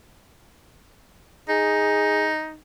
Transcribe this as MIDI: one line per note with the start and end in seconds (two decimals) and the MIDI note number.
1.49 2.57 63
1.49 2.28 68